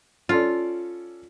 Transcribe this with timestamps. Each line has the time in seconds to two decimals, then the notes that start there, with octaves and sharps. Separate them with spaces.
0.29 C#4 F4 A4 D5